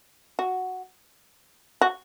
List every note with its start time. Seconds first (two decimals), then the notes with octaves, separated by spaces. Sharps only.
0.39 F#4
1.81 F#4